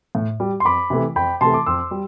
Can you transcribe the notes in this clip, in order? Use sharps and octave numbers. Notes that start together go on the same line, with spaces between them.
A2
G3
C6
F2 B5 D6
C3 E3 A3
F2 G5 B5
C3 E3 A3 A5 C6
D6
F2 C6 E6
G3